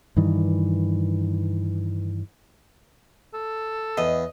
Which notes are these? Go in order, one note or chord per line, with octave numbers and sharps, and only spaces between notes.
G2 D#3 E3
A4
E2 D#5